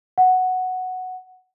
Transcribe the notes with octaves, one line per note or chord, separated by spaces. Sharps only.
F#5